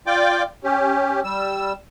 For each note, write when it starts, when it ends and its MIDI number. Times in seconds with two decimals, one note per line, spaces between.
0.07 0.43 65
0.07 0.43 74
0.07 0.43 79
0.07 0.43 86
0.64 1.20 61
0.64 1.20 67
1.24 1.73 55
1.24 1.73 88